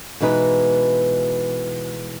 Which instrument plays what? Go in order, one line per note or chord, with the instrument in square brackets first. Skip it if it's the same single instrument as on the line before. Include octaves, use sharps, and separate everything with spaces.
[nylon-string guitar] B2 E3 G#3 D#4 B4